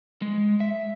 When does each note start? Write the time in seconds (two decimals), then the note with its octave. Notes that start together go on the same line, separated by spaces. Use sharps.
0.22 G#3
0.60 E5